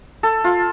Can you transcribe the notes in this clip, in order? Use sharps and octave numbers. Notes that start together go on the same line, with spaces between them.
A4
F4